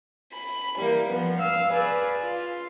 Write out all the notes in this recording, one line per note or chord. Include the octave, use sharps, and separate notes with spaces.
B5
E3 G3 A#3
F3 B3
F5 E6
G#4 B4 D5
F4